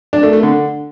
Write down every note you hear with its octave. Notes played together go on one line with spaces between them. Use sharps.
D4
A3
A3
D3